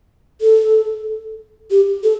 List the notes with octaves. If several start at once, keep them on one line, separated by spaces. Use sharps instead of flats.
A4
G4
A4